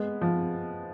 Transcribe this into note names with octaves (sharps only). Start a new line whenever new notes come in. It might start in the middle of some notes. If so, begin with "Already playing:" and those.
Already playing: G#3 B3
F3